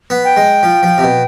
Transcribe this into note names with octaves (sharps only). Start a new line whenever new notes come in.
B3
G5
G#3
F3
F3
C3
B2